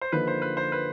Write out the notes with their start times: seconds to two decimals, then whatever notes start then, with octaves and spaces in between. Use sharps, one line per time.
0.01 C5
0.12 D3 F3 A#3 D#4 B4
0.27 C5
0.42 B4
0.57 C5
0.72 B4